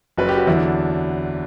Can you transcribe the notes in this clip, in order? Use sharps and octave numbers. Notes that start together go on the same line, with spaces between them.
F#1 F#2 F#3 B4
G4
F#4
E2 D3 F#3 E4
D4